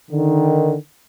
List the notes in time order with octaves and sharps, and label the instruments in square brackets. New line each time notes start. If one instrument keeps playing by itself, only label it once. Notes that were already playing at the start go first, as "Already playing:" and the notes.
[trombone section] D3 D#3